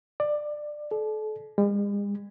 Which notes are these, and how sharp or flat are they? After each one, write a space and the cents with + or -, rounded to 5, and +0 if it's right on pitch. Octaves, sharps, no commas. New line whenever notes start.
D5 +20
A4 -35
G#3 -45